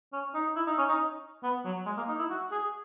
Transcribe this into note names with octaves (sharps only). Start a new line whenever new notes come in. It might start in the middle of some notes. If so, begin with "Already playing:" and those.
C#4
D#4
E4
D#4
C#4
D#4
B3
F#3
G#3
A#3
D#4
E4
F#4
G#4